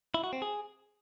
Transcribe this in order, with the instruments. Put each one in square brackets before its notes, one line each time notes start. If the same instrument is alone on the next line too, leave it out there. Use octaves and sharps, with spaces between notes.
[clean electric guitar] E4
F#4
C4
G#4